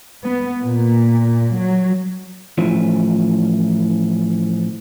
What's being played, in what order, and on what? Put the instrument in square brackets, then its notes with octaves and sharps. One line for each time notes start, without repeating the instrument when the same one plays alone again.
[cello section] B3
A#2
F#3
[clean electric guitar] A2 E3 F3 C#4